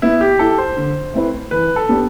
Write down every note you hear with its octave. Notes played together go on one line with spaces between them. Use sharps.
B3 E4
G4
E4 G4 A4
C5
D3
A3 C4 E4 B4
E3 B4
A4
B3 D4 G4